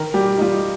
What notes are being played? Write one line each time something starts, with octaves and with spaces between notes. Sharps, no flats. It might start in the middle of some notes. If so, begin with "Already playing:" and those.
Already playing: D#3 A#4
G3 G4
D#4
G3 F4